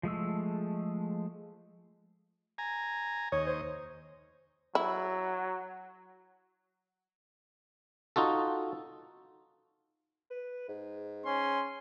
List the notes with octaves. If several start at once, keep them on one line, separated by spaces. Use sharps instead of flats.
F3 G#3 A3 E6
G#5 A#5
D#2 C#5 D#5
C5
F#3 E4
D#4 F4 F#4 A4
B4
G#2
C#4 C6